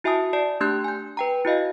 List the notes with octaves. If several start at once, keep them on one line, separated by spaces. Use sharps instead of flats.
E4 F#4 E5 G#5 A5 D#6
D5 A5 C7
A3 D4 G4 C6 F#6 G6
G#5 G6
B4 G5 A#5
E4 F#4 D#5 F5